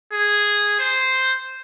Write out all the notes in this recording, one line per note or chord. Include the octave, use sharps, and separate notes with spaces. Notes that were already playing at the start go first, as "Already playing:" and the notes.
G#4
C5